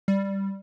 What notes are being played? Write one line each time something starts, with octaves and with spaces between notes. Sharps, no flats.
G3